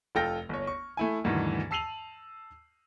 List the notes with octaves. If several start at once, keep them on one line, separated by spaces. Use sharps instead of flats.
F1 F4 A4 G5 F6 A#6
G1 C#5
C#6
A3 E4 G#5
D2 G2 B2 D#3 E3
A5 E6 C7 D#7 F7 F#7